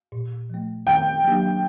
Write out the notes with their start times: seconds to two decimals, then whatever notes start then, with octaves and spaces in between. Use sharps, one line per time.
0.12 A#2
0.50 F3 A3
0.86 D#3 G5
1.24 F#3 A#3 D4 G4